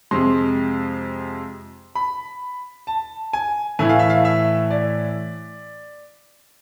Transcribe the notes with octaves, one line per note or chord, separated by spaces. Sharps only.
F2 C3 G#3 C6
B5
A5
G#5
A2 E3 A3 E4 G#5
F5
E5
F5
E5
D5